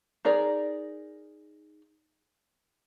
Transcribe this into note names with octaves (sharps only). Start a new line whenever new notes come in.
D#4 G#4 A#4 D5